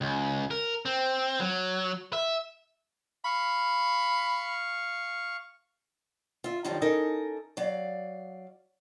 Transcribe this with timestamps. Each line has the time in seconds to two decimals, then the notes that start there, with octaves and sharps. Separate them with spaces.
0.01 C#2
0.51 A#4
0.85 C4
1.40 F#3
2.13 E5
3.25 F5 B5 C#6
6.44 F4 E5
6.65 F#2 D#3 F3 G3 D4 D#4
6.82 C#4 D#4 A4 A#4
7.57 F#3 D5 F5